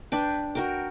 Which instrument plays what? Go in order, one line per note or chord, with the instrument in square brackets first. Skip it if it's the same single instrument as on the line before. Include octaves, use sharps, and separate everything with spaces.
[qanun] D4 B4 G5
F#4 A#4 G5